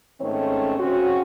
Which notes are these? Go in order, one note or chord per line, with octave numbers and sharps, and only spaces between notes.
G#2 D#3 A3 C4 C#4 C#5
C#3 C4 C#4 F#4